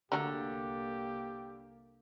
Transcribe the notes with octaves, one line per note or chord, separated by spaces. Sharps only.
C2 D3 F#3 A3 A#3 G4 A#4